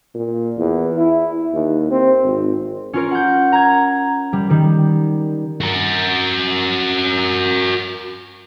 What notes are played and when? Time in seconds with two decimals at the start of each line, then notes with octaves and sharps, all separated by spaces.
0.14 A#2
0.58 E2
0.98 E4
1.54 D#2
1.91 C4
2.24 G#1
2.93 C#4 F4 A#4
3.11 F#5 G6
3.52 A#5 G#6
4.33 G3
4.50 D#3 G3
5.61 F#4 A#4